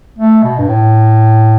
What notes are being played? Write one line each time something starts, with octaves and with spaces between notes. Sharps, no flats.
A3
B2
G2
A2